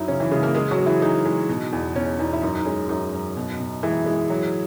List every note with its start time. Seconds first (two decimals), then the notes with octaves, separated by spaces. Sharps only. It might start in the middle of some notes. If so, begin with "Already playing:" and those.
Already playing: F#2 F#3 D#4 E4
0.08 C#3 C#4
0.20 E3 E4
0.31 C#3 G#3 G#4
0.43 A#3 A#4
0.55 G#3 G#4
0.71 F#3 F#4
0.78 G#3
0.86 E3 E4
1.02 G#3 D#4
1.25 G#3
1.49 B2
1.73 E2
1.95 B2 C#4
2.19 E2 D#4
2.33 E4
2.42 F#2 D#4
2.55 D#4
2.65 G#3 C#4
2.89 F#2 D#4
3.13 F#2
3.37 B2
3.60 B2
3.83 E3 G#3 E4
4.06 G#3
4.30 F#3